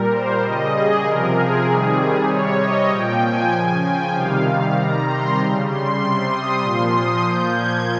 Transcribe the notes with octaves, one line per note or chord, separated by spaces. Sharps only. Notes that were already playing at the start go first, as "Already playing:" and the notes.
Already playing: A#2 G3 A#4
C5
C#3 G3 D#5
G#4
C3 F3 A#4
G#4
C3 D#3 G3
C3 G3 C#5
D#5
A#2 F3 G5
G#5
C#3 F3 G#5
G5
C3 D#3 G3 F5
C3 D#3 G3 A#5
C6
C#3 G3
C6
C3 G3 C6
D#6
A#2 F3 C6
D#6
A#2 F3 G6
G#6